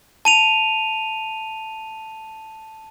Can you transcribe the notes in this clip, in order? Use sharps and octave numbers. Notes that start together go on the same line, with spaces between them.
A5 D#7 F7